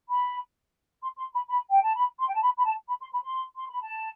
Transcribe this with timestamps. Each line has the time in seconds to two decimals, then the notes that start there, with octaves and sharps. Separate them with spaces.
0.08 B5
1.02 C6
1.16 C6
1.32 B5
1.48 B5
1.70 G5
1.81 A5
1.95 B5
2.18 C6
2.26 G5
2.33 A5
2.41 B5
2.58 B5
2.64 A5
2.87 B5
3.00 C6
3.12 B5
3.23 C6
3.55 C6
3.68 B5
3.81 A5